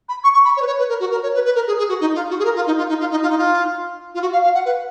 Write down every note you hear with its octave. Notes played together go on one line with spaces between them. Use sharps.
B5
C#6
C#6
B5
C#5
B4
C#5
B4
A#4
F#4
A#4
C#5
B4
B4
A#4
G#4
G#4
F#4
D#4
F4
F#4
G#4
A#4
F4
D#4
F4
D#4
F4
D#4
F4
D#4
F4
F4
F#4
F5
F5
F#5
B4